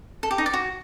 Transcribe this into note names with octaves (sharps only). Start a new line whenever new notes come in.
A4
G4
D#4
D5
F#4